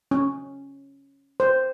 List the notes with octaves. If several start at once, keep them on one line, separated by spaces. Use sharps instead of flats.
C#4
C5